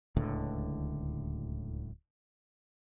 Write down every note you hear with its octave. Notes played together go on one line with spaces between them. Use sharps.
D1 C#2 A2 D3